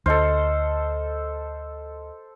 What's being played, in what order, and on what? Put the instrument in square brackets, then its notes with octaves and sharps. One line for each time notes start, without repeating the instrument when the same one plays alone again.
[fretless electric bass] D2 [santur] A4 C5 [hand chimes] D#5 F6